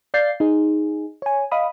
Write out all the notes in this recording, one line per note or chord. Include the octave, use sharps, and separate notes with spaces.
D5 F5 G6 A6 C7
D#4 G#4
C#5 G#5
D#5 F5 B5 D#6